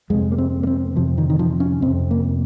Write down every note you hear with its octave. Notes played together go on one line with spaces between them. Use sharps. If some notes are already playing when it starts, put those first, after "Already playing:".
F2 C3 G#3
A#3
C4
A#3
C4
F2 C3 F3
D#3
D#3
F3
C#4
F2 C3 C4
A#3